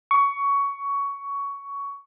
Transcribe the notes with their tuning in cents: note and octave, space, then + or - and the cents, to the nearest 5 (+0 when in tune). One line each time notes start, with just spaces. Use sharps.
C#6 +15